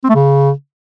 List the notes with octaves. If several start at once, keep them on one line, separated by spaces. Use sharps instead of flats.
C4
A3
C#3